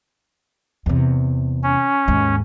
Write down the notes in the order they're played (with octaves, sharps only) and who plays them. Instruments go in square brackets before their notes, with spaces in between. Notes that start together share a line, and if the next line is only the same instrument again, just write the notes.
[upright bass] E2 C3
[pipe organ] C#4
[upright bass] D#2 G#2